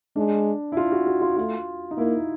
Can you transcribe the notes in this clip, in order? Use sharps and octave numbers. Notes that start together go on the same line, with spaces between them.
G#3 D4
E4
F4
F#4
F#4
F4
A3 F4
D#4
A#3 E4